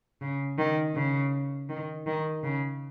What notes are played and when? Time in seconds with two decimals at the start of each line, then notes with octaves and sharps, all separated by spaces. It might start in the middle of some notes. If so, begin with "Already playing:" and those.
0.21 C#3
0.58 D#3
0.95 C#3
1.69 D#3
2.06 D#3
2.43 C#3